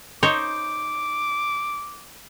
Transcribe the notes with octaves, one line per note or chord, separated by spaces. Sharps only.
D#4 C5 C#5 D6